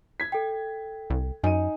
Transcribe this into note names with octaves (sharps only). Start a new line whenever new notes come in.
G#6 B6
A4 G5
C2
F#2 D#4 G#5 D#7